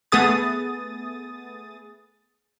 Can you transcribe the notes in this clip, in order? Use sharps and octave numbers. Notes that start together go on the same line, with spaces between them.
A3 B3 G#4 D#6 A6